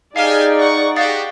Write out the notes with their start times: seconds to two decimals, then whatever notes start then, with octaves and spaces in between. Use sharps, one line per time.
0.16 D#4 G4 G#4 D5 F5 G#5 F6
0.60 F#5 C#6
0.96 F#4 G4 F5 D#6 A6